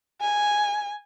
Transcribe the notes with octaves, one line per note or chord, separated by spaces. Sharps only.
G#5